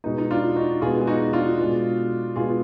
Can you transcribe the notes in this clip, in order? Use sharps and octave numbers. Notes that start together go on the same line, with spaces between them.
B2 G#3 B3 D#4
D#4
D4 F4
D#4 F#4
B2 G#3 B3 F4 G#4
G#4
D#4 F#4
D4 F4
B2 G#3 B3
B2 G#3 B3 F4 G#4